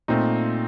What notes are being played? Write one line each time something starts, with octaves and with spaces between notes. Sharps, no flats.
A#2 A3 C4 D#4